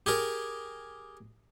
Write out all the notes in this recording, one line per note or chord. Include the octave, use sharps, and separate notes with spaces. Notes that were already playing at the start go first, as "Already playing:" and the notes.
G4 G#4 A#4